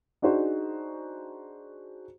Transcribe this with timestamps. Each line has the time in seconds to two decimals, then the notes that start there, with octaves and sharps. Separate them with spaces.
0.22 D4 D#4 F#4 G#4 C5